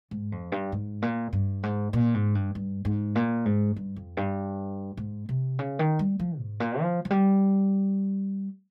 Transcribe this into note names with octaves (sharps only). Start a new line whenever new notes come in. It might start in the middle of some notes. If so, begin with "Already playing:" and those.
G#2
F2
G2
G#2
A#2
G2
G#2
A#2
G#2
G2
G2
G#2
A#2
G#2
G2
F2
G2
G#2
C3
C#3
D#3
G3
F3
G#2
A#2
F3
F3
G3